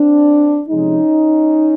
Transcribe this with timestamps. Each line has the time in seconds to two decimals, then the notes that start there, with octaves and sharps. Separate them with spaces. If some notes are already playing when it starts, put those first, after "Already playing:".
Already playing: C4 D4
0.68 C3 F3 G#3 C#4 D#4